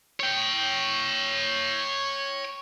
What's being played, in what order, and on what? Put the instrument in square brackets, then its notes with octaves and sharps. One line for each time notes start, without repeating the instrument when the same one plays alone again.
[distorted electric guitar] C#5 G5